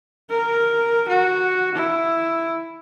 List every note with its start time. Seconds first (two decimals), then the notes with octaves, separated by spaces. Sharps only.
0.29 A#4
1.08 F#4
1.75 E4